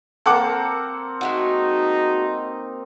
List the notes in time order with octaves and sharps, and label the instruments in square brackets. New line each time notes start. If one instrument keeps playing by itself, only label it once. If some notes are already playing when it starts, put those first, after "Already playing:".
[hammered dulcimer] A#3 C4 [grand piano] A4 F#5 D6
[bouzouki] G#3 A3 F#4 [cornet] D#4